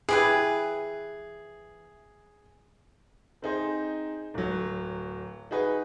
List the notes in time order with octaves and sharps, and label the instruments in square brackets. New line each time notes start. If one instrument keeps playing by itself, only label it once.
[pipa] E3 G4 B4 [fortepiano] G#4
[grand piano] C4 D#4 G#4 C5
D1 F#3
D#4 F#4 G#4 B4